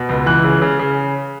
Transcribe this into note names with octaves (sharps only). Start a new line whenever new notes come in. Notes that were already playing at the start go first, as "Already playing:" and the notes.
Already playing: B2
C#2
E3 F#6
C#3
C#3
C#3